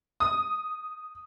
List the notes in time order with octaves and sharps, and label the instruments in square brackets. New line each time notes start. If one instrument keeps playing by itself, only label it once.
[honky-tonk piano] D#6